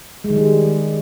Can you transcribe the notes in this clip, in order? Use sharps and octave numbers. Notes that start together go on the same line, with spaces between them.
G#3
D#3
G3